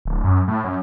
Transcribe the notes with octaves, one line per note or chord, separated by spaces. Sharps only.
D1
F#2
A2
F#2